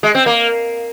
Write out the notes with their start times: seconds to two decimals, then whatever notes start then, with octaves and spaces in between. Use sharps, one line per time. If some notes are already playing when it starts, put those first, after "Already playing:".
0.03 G#3
0.15 C4
0.26 A#3